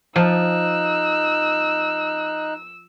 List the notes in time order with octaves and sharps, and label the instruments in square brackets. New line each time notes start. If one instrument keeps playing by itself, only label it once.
[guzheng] F3 [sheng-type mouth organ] D#4 F#6 [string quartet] E6